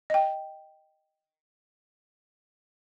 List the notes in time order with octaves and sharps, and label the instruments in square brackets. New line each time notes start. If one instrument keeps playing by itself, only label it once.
[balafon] D#5 G5